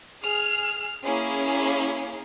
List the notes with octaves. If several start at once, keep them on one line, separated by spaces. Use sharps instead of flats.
G#4 F6
A#3 C#4 E4 G#4